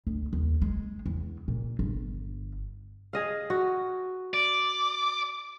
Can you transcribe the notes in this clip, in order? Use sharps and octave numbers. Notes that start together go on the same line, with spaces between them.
D2
D#2
G#3
E2
A#2
G1
G#4 D#5 F5
F#4
D5